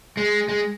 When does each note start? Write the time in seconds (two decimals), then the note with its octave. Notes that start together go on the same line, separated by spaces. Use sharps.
0.17 G#3
0.49 G#3